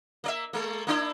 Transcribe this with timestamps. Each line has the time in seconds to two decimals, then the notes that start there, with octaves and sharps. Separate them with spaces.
0.24 A#3 D5 E5
0.53 G#3 A#3
0.87 A#3 D4 E4